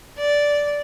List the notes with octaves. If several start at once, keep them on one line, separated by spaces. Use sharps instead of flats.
D5